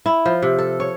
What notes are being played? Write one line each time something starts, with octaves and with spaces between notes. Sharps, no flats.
E4
F3
C3
A4
C#5